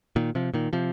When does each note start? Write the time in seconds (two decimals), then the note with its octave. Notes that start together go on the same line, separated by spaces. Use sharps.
0.16 A#2 D#3
0.35 C3 F3
0.54 A#2 D#3
0.73 C3 F3